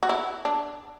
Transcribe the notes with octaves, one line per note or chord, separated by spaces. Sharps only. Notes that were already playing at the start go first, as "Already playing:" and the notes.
F#4
E4
D4